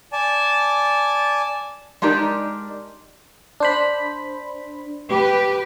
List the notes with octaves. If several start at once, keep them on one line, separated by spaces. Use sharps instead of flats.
D5 G#5 A5
G#3 D4 D#4 G4 A#4 D5
D4 C5 B5
G4 B4